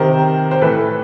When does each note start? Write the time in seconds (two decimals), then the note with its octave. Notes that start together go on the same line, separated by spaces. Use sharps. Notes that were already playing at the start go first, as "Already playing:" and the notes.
Already playing: C3 D#3 A#4 C5
0.51 C5
0.61 A2 E3 A4 B4